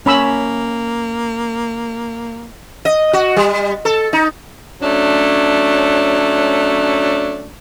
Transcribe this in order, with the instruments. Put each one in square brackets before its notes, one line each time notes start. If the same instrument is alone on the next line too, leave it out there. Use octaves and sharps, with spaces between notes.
[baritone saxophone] A#3 [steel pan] C#4 B5 E6
[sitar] D#5
F#4
G3
A4
D#4
[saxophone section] F#3 A3 C#4 D4